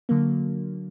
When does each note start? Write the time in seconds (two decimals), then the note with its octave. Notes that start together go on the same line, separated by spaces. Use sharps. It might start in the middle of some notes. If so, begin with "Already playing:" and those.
0.09 D3 F#3 A#3